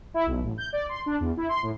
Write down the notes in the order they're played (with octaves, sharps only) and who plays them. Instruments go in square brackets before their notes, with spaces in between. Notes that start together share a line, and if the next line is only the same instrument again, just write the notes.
[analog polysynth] E4
B1
A1
G6
D5
C6
D4
E2
E4
C6
A2